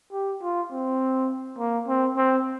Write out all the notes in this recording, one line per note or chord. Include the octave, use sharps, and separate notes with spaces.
G4
F4
C4
A#3
C4
C4